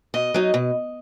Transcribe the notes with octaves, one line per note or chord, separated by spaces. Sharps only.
B2 D#5
F#3 D#4
B2